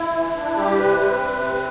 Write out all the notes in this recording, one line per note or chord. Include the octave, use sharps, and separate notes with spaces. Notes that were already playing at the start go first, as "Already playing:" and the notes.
Already playing: E4
E3
D4
G3 G4
C3 B4
C4
C3
C4